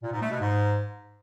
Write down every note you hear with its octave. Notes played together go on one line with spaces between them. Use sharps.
A#2
G#2
A3
B2
G#2